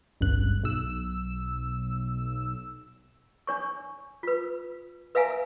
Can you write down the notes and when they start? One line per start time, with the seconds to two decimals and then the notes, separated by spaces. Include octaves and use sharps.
0.21 G#1 C#2 G2 F#6
0.63 B1 E6
3.47 D4 C#5 C#6
4.23 F4 B4
5.15 B4 E5 F5 G#5 A#5